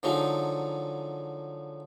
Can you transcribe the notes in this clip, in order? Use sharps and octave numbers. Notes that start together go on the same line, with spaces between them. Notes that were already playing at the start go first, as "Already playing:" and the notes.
D3 F3 F#3 G#3 D#4